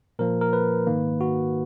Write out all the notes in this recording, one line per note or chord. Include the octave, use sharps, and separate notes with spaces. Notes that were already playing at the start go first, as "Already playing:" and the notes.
A#2 F3 A#3 A#4
A#4
B4
G#2 D#3 A#3
F#4